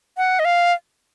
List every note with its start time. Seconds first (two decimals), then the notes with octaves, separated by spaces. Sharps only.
0.17 F#5
0.39 D#5
0.45 F5